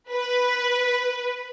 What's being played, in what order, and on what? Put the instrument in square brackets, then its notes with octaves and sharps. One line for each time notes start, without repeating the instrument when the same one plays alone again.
[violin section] B4